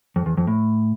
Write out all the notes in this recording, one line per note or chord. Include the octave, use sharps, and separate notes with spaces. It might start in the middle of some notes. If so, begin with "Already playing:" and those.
F2
E2
F2
A2